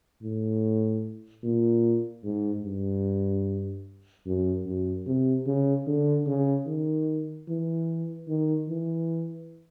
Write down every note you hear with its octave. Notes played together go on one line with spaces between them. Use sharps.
A2
A#2
G#2
G2
F#2
F#2
C3
C#3
D3
C#3
D#3
E3
D#3
E3